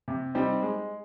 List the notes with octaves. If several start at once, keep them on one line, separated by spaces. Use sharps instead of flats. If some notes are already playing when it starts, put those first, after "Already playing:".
C3
G3 C4 D#4
G#3